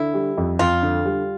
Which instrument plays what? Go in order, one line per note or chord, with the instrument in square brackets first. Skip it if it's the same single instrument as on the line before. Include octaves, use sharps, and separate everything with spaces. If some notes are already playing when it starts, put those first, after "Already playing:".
Already playing: [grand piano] D3 [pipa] E4
[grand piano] G3
F2
[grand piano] F2 [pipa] F4
[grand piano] D3
G3